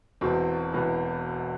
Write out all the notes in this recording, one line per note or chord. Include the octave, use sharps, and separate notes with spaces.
E1 E2 B2 C4
E1 E2 B2 B3